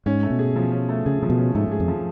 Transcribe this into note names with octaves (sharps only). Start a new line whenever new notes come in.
G#2 C#4
A3
B2
G#4
F3
C#4
A3
C#3 G#4
C#3 F3
B2
C#4
G#2 A3
G#2 G#4
F2
F3